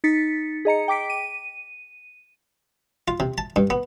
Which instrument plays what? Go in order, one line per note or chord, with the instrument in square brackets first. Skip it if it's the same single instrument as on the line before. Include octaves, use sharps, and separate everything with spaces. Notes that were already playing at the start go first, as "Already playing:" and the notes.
[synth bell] D#4 A6 B6 C#7
G#4 D#5 A#5 C#7
G5 D6 B6 D7
D#7
[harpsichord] F4
C3
A5
G2
B3